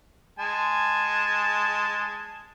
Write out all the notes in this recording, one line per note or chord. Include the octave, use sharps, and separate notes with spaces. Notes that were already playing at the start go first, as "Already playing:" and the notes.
G#3 G#5 A5